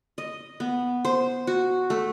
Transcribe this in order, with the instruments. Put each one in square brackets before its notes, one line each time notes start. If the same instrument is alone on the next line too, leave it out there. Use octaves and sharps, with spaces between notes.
[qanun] D#5
B3
C5
F#4
A3